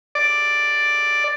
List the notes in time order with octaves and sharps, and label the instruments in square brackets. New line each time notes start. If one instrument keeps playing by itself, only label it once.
[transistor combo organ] D5